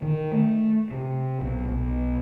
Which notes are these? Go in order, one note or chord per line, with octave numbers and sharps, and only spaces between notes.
D#3
A3
C3
B1
B1